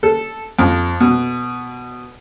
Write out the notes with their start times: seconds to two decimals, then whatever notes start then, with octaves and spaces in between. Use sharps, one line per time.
0.03 A4
0.59 F2
1.00 B2